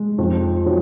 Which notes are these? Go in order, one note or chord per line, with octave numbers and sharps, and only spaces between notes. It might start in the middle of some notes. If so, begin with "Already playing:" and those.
Already playing: G#3
F2 F3
F3 F#3